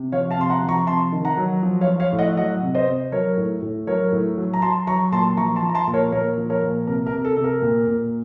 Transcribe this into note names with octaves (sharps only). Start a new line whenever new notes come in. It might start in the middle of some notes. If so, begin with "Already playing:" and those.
Already playing: C3
F3 C#5 F5
F5 A5
C3 C6
F#5 A#5
F3
A#5 C#6
C3 A5 C6
D#3
F#5 A#5
F#3
F3
C#5 F5
F3
C#5 F5
A2
D#5 F#5
F#3 D#5 F#5
C3
C5 D#5
C3
F#3 A#4 C#5
A2
A2
F#3 A#4 C#5
A2
F#3
A#5
F#3 A5 C6
F#3 A#5 C#6
A#2 A5 C6
F3 A#5 C#6
A5 C6
F3
A#5
A5 C6
A#2
A#4 C#5
A#2 A#4 C#5
F3
A#4 C#5
A#2
C3 A#4
A#4
C3
A4
C3 A4
A#4
A#2
A#2